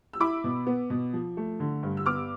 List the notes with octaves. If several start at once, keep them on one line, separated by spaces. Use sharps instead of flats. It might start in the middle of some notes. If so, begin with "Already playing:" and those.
E6
E4 B5 D6
B2
B3
B2
F3
A3
D3
G2
E6
B3 D6 F6